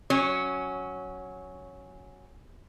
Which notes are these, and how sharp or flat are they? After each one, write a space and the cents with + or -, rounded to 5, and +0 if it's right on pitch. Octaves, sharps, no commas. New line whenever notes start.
F#3 +0 C#4 +0 C#5 +15